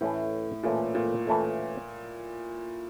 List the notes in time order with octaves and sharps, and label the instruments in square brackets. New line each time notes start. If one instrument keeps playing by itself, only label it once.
[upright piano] A2 [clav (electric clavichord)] E3 A3 C#4 E4 A4
[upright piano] A#2 [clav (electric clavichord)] E3 A3 C#4 E4 A4
[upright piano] A#2
[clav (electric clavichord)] E3 A3 C#4 E4 A4